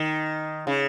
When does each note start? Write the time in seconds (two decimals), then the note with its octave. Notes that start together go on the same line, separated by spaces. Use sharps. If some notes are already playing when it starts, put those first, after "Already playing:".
Already playing: D#3
0.67 C#3